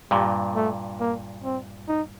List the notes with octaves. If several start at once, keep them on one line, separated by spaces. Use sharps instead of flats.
G2 A#2 G3
A3
A#3
C4
D#4